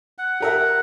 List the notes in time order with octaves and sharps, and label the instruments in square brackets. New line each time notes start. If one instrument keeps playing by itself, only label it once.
[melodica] F#5
[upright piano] G4 A#4 E5